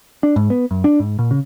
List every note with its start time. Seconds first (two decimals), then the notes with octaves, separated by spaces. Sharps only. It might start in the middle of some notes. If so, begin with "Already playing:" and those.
0.23 D4
0.36 G#2
0.50 B3
0.71 F#2
0.84 D4
1.00 G#2
1.19 A#2
1.31 C#3